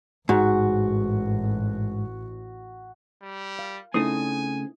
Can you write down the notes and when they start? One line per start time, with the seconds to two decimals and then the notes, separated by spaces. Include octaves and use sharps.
0.29 A1 G#2 F#4
3.23 G3
3.59 F5
3.94 C#3 A3 C4 D#4 E4 G#5 D#6